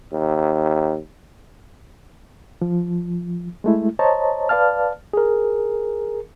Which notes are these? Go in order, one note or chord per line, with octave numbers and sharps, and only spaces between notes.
D#2
F3
G#3 A3 E4
C5 C#5 D#5 A5 A#5
B4 D5 F5 A5 F6
G#4 A#4